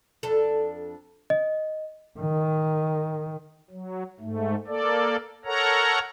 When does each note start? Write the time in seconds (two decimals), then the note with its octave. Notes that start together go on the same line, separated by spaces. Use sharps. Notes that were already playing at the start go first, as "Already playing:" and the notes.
0.23 F2 D4 A4
1.30 D#5
2.20 D#3
3.70 F#3
4.20 G#2 A3
4.67 A#3 A4 D5
5.45 A4 A#4 C#5 F#5 A#5